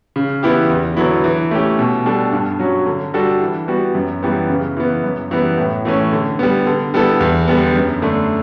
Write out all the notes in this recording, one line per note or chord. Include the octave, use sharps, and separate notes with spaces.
C#3
E3 B3 E4 G4
E2
D3 F#3 B3 E4
E3
A3 C#4 G4
B2
G3 D4 A4
G2
F#3 C#4 F#4
D3
G3 D4 F#4 A4
E3
G3 B3 F#4
F#2
E3 G3 B3
C#3
E3 B3
F#2
E3 G3 B3
A2
E3 A3 C#4
D3
G3 B3
D3
G3 B3 E4 A4
E2
D3 G3 B3
F#2
D3 A3 D4